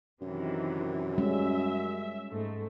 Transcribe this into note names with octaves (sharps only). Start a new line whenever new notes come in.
F#2 C3 D#3 E3
G3 G#3 C#4 E5
G#2 A3